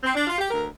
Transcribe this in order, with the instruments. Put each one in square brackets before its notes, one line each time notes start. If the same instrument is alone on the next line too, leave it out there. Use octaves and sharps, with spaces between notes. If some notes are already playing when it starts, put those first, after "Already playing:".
[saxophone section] C4
D4
F4
G4
D2 A#4